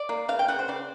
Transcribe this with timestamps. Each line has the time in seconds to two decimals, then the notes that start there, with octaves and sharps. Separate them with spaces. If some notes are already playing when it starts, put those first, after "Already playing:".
Already playing: D5
0.09 A#3
0.28 C#3 F5
0.39 G5
0.48 C#3 F#5
0.59 C5
0.68 C#3 D5